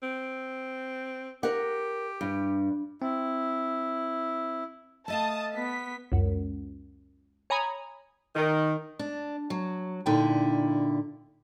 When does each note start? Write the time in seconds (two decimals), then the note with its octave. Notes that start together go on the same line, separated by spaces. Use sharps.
0.03 C4
1.43 G4 A#4 F#5
2.21 G2
3.02 C4 E4
5.08 A3 D#5 F5 A5 D#6
5.55 B3 B6
6.12 C#2 F#2
7.50 C#5 G#5 A#5 B5 D#6
8.35 D#3
8.99 D4
9.50 F#3
10.06 A#2 D3 D#4 E4 G5